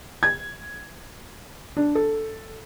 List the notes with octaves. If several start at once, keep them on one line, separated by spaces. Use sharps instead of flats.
G#6
D4
A4